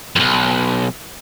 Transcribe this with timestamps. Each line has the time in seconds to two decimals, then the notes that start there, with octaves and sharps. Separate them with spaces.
0.16 B1 F2